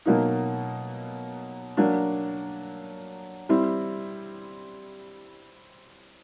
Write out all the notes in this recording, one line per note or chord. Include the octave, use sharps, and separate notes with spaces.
B2 F#3 A#3 D#4
F#3 A#3 D4
G3 C4 E4